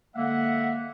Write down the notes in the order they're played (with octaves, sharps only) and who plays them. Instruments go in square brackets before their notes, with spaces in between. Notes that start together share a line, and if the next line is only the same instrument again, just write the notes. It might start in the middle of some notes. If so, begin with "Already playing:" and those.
[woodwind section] D3 G#3 A#3 [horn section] E5 F#5